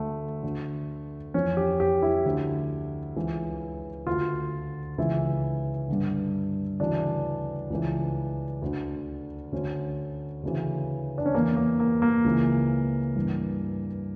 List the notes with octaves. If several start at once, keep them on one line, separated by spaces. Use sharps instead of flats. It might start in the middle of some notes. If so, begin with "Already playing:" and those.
Already playing: D2 D3 A3
D2 D3
F2 E3 C#4
G4
G4
E4
D2 D3
C#2 C#3 E3
D2 D3 F4
C#2 C#3 E3 E4
G2 D3
D2 C#3 E3 D4
C#2 C#3 E3
D2 D3
D2 D3 C#4
D2 C#3 E3
D4
C#4
E2 E3 A#3
A#3
A#3
A#3
C#2 C#3 E3
G2 E3